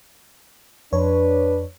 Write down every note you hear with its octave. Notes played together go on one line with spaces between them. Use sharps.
F2 D4 B4 C#5